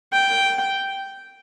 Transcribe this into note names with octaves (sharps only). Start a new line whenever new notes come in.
G5